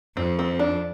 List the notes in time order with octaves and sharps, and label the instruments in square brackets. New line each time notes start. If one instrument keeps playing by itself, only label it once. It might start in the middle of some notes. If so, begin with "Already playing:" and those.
[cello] F2 [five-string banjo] C4
[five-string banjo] C4
D4